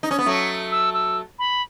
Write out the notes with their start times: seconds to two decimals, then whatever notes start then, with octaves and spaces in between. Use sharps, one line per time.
0.03 D#4
0.11 C#4
0.18 B3
0.26 F#3 A3 C#6
0.72 E6
0.94 E6
1.39 B5